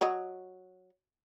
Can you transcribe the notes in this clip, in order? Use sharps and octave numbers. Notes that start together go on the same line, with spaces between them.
F#3 F#4 D#5